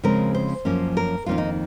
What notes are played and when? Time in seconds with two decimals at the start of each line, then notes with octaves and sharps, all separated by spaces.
0.03 C#3 F3 G#3 C4 A#4
0.34 C5
0.65 F#2 F3 A#3 C#4
0.97 A#4
1.26 F2 D#3 A#3 C#4 F4
1.38 D#4